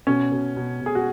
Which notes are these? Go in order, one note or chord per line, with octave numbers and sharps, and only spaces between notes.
B2 C#4
B2
B2
B2
G#4
F#4